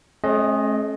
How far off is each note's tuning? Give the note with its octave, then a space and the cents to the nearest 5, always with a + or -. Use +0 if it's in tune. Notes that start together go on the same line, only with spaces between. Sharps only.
A3 -45 C#4 -35 D#5 +0